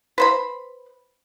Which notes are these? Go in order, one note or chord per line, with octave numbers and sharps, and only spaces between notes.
B4 C5 B5